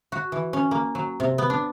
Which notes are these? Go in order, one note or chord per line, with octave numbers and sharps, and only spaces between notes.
F#4
E3
C#4
A#3
F#3
C3
B3
D4